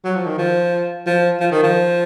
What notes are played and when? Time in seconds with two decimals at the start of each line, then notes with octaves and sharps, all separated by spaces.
0.04 F#3
0.15 F3
0.26 D#3
0.38 F3
1.06 F3
1.40 F3
1.51 D#3
1.63 F3